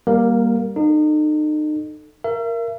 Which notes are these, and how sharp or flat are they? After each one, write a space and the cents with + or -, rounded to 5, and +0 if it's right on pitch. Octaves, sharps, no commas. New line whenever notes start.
G3 +0 A#3 +15 A#4 -10
D#4 -35 A4 +0
A#4 +0 E5 +40